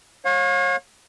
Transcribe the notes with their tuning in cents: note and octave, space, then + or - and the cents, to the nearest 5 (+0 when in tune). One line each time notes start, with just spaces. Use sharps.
C#5 -30 F5 +35